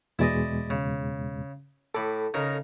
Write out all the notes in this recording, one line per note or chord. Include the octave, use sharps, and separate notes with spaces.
E2 B2 G#3 E4 D5 D#5
C#3
A2 A4 B5 D6
C#3 D#4 A#4